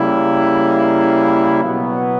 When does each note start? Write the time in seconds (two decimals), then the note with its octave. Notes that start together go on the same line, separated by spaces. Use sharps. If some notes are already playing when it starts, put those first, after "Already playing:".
Already playing: C#3 G3 A#3 E4
1.63 B2 F#3 B3